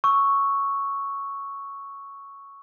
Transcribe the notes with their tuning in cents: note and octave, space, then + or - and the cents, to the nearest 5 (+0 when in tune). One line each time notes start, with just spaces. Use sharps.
C#6 +0 E6 -5